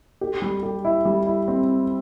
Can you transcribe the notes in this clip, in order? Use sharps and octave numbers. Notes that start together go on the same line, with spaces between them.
G4
G3
G4
E4
G3
E4
C4